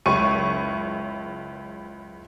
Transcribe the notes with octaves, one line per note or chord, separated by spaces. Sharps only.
F#1 C#2 C#6 D#7